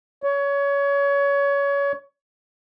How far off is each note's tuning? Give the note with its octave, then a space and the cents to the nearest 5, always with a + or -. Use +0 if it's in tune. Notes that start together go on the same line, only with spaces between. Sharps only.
C#5 +25